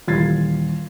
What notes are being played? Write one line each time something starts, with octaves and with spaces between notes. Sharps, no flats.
D#1 E3 F4 G#6 A6 C7